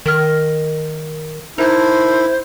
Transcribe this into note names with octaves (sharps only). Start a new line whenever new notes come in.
D#3 A#4 D#5 F6
D#4 E4 A#4 C5 A5 F#6